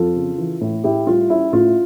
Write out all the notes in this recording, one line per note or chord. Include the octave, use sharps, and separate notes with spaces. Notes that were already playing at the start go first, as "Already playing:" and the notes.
Already playing: F2 F4 A4
C#3
E3
A2
A2 E4 G4
G3 F4
C#4 E4
A2 F4